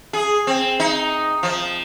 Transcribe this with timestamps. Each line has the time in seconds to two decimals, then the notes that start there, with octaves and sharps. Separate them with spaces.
0.13 G#4
0.47 C4
0.80 D#4
1.43 F3